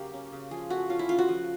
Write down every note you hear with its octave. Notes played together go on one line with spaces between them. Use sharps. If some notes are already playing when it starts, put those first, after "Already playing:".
Already playing: C#3 F#3 A#3 G4
C#4
C#3
F3 G#4
A3 F#4
C#4 F4
E4
C#3 F4
F#4
F3